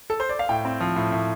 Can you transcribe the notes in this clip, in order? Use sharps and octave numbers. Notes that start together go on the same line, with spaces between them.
A4
C5
D5
F5
A2 G5
C4
F3
A2
A2